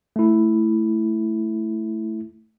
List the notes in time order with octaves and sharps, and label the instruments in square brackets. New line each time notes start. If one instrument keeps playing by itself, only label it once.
[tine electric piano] A3 E4